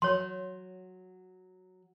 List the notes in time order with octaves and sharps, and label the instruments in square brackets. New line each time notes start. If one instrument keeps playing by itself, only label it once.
[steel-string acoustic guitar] F#3 [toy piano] C#5 C6